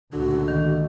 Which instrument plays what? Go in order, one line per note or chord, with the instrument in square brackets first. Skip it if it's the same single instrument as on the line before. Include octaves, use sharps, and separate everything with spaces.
[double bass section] C#2 A#2 A3 [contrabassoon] D3 [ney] F#4
[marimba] D#3